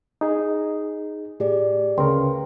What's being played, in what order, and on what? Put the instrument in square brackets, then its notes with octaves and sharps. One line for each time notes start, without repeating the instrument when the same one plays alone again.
[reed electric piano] D#4 G#4
[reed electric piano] A2 [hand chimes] G4 G#4 D5
[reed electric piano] D2 C#3 A#4 [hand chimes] B4 G5 C6